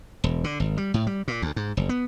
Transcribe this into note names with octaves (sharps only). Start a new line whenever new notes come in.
E1
D3
G#1
G3
A2
G3
A#2
D2
G#2
F#1
B3